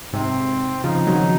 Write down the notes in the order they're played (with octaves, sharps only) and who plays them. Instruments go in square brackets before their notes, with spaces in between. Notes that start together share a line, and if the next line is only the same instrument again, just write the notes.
[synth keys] G#2 C3 [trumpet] C4
[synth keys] C#3 F3 [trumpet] D#4
[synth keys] D#3 F#3